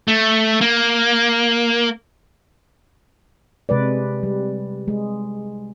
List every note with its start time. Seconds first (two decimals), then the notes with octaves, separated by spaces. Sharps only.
0.08 A3
0.61 A#3
3.69 C3 G#3 B4 D5
4.23 G3
4.88 G#3